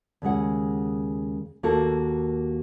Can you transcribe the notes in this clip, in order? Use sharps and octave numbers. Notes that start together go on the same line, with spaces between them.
D#2 C#3 G#3 F#5
D#2 A#3 F#4 A4 A#4 A5